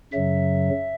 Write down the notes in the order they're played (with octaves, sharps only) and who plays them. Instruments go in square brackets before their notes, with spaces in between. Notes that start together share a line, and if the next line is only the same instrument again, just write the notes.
[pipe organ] F#2 C#3 F#3 E5